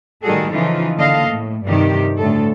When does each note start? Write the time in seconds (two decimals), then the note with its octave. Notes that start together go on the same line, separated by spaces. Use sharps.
0.23 A2 D#3 G3 F#4 G#4 A4
0.52 C#3 E3 F3 D#4 F4
0.96 D3 A#3 A4 D#5 F5
1.28 A2
1.65 G2 C3 D#3 G4
2.18 D2 A2 A4